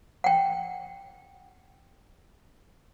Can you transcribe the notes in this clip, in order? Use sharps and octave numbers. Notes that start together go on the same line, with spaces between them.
F#5 G5